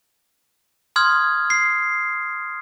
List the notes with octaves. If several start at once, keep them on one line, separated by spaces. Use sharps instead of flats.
C6 D#6 F6 G#6
C7